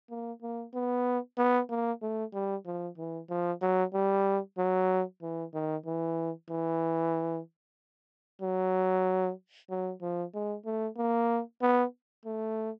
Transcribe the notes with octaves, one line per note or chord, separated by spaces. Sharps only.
A#3
A#3
B3
B3
A#3
A3
G3
F3
E3
F3
F#3
G3
F#3
E3
D#3
E3
E3
F#3
F#3
F3
G#3
A3
A#3
B3
A3